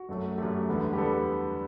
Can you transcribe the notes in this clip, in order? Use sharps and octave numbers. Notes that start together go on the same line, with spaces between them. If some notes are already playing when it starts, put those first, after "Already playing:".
Already playing: F#4
F#2 F#3 A3
F#2 F#3 A3 G4
E2 D3 G3 B3
G4
D3 G3 B3 A4